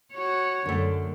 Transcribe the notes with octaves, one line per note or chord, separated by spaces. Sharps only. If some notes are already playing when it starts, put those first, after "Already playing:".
F#4 C#5
F#2 D3 A3